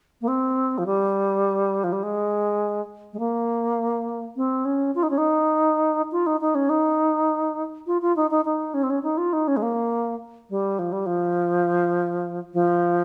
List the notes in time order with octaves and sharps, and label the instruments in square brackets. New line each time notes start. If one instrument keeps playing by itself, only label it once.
[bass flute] A#3
C4
F3
G3
F3
G3
G#3
G#3
A#3
C4
C#4
F4
D#4
C#4
D#4
F4
D#4
D#4
C#4
D#4
F4
F4
D#4
D#4
D#4
C#4
C4
C#4
D#4
F4
D#4
C#4
G#3
A#3
G3
F3
G3
F3
F3